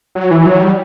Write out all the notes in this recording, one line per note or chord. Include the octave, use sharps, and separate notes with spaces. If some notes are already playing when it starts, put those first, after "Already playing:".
F#3
E3
F#3
G3